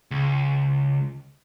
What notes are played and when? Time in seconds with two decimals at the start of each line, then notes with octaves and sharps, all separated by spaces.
0.11 C#2